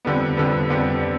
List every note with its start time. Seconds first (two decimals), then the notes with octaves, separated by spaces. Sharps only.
0.05 F2 D3 G3 B3
0.37 F2 D3 G3 B3
0.70 F2 D3 G3 B3